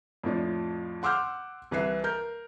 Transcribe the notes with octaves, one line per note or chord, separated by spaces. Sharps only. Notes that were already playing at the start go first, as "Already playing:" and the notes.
F2 A2 F3 D4
F#5 C6 D6 E6 F6 G6
C2 E3 B4 E5 C7
A#4 G6